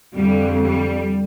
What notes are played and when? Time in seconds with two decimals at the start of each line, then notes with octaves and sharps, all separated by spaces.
0.15 F2 D3 G3
0.63 G3